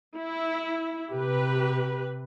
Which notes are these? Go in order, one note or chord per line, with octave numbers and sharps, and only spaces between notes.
E4
C3 G4 B4